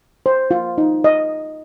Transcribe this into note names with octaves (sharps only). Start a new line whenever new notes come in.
C5
F4
D#4
D#5